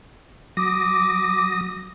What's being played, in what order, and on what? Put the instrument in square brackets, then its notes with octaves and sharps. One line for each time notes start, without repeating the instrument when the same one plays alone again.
[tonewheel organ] F#3 D#6 A#6 [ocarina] D6